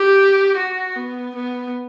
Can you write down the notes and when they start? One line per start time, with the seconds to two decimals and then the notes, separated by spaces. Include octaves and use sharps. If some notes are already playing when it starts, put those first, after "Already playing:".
Already playing: G4
0.57 F#4
0.96 B3
1.35 B3